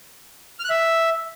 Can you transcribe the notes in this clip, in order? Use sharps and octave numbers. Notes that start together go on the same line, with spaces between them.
F6
F#6
E5